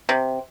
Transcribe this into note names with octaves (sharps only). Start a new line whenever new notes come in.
C3